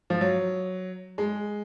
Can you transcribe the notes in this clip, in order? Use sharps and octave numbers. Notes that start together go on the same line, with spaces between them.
F3
F#3
G#3